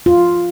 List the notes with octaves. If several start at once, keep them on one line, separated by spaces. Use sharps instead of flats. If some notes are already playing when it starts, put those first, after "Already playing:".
F4